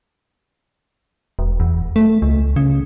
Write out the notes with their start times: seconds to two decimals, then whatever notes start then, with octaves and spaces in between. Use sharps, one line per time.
1.39 E1
1.60 E2
1.96 A3
2.22 C#2
2.56 C#3